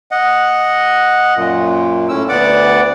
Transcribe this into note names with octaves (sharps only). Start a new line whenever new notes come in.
D#5 F#5
F#2 A#2
A2 C#4 E6
D2 B3 D5 F#5 D6